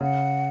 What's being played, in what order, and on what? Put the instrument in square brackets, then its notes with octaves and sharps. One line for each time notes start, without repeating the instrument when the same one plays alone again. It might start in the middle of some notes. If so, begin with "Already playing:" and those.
[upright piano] C#3 [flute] F#5